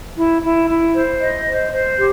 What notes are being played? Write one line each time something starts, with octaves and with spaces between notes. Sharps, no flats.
E4
E4
E4
C5
D#5
C5
C5
G4